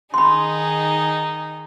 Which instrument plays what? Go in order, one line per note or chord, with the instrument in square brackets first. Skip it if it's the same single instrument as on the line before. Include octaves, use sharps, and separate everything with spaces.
[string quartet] D#3 D#4 G#4 [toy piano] B5 C6